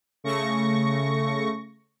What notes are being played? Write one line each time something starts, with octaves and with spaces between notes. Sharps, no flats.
C#3 A3 C#6 A#6